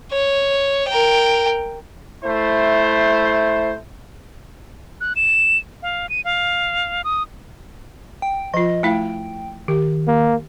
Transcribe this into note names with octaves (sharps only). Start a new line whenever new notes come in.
C#5
A#4 G5
A3 E4 C5
F#6
E7
F5
D#7
F5
D#6
G5
F3 F4 D#5
A3 E4 F5 G5
D#3 G4
A#3